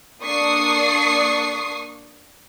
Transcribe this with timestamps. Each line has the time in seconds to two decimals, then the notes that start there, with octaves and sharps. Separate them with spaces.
0.23 A#3 D4 C#6 D#6 C7